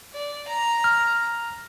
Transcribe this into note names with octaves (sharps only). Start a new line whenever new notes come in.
D5
A#5
F6